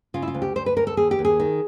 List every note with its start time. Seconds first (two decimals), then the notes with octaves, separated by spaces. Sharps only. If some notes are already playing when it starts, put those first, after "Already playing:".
0.14 C#3 F4
0.22 E4
0.28 F4
0.34 D2
0.42 G4
0.55 D2 C5
0.66 B4
0.76 D2 A#4
0.87 A4
0.97 D#2 G#4
1.11 G4
1.19 D#2
1.25 G#4
1.40 D#3